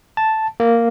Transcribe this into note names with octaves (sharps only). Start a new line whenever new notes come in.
A5
A#3